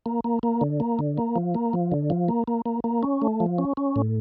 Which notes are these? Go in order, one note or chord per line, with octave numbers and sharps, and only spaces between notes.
A#3
A#3
A#3
D3
A#3
D3
A#3
F3
A#3
F3
D3
F3
A#3
A#3
A#3
A#3
C#4
A3
F3
C#4
C#4
A2